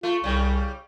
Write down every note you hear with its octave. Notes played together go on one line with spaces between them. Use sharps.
A3 F4
C2 C#3 G3